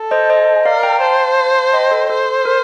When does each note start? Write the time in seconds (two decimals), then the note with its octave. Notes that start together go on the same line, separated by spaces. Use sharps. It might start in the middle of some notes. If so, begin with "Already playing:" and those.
Already playing: A4
0.11 C5 D#5
0.30 C5 D#5
0.65 A#4 D5 F5
0.83 G5 A#5
1.01 C5 F5 A5
1.65 A5
1.73 D#5 G5
1.91 A4
2.10 A4 C5
2.45 A#4